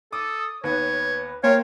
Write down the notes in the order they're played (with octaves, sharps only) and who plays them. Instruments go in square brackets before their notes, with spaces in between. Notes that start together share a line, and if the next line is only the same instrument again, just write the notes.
[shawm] A4 [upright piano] D6 [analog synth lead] D#6
[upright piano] D#2 B3 [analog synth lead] B4 [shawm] C#5
[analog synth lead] A#3 [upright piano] A#4 C5 G5 [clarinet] C#5 [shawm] F5